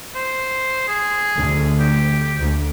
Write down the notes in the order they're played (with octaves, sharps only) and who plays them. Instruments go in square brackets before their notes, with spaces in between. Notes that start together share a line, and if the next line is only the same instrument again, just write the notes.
[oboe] C5
G#4
[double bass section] D2
[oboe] G4
[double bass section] D2